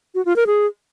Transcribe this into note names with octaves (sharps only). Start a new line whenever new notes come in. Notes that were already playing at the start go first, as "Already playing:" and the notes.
F#4
F4
A#4
G#4